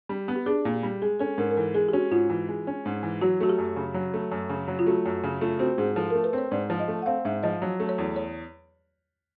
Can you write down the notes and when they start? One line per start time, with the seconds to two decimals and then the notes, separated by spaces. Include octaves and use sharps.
0.09 G3
0.28 B3
0.36 G4
0.46 D4 G#4
0.65 A#2
0.74 G4
0.83 G3
1.02 G#3 G#4
1.20 C#4 A4
1.38 G#2 A#4
1.51 A#4
1.57 E3 A4
1.74 G#3 G#4
1.88 G4
1.93 C#4 F#4
2.11 G#2 F4
2.29 E3
2.48 G#3
2.67 C#4
2.86 G#2
3.03 E3
3.22 F#3 F#4
3.40 A3 F#4
3.49 G4
3.58 F#2
3.76 C#3
3.94 F#3
4.14 A3
4.32 F#2
4.49 C#3
4.68 F#3
4.79 F4
4.87 A3 F#4
5.06 F#2
5.23 C#3
5.41 A3 F4
5.59 C4 F#4
5.78 G#2 G#4
5.96 F3 A4
6.10 A3 A#4
6.24 B4
6.33 C4
6.38 C#5
6.51 G#2 D5
6.70 F3
6.79 D#5
6.88 A3
7.02 F#5
7.06 C4 F5
7.25 G#2 E5
7.43 F3 D#5
7.62 F#3
7.80 A3
7.89 C#5
7.98 E2
8.16 C#5